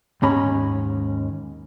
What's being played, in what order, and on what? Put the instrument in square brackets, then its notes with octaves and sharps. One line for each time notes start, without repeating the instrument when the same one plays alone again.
[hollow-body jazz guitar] D#2 G#2 C#4 A#5 B5